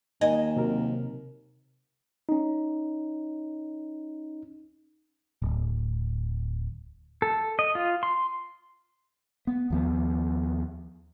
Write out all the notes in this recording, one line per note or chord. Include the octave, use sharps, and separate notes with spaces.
D#2 D#5 G#5
C3 F#3 A#4
C#4 D#4
D1
A4
D#5
F4
C6
B3
D#2 F3 B3